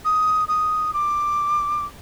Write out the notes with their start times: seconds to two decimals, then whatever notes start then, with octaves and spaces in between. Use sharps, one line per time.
0.05 D#6
0.48 D#6
0.93 D6